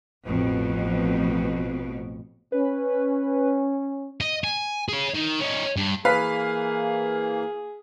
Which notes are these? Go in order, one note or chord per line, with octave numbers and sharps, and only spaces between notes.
A1 F2 B2
C#4 B4
D#5
G#5
G#4 C#5
D#3
C#4 D#4
G2
E3 A#3 G#4 B4 F5 B6